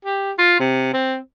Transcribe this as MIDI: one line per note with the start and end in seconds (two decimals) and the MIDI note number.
0.05 0.32 67
0.39 0.56 65
0.60 0.93 48
0.93 1.17 60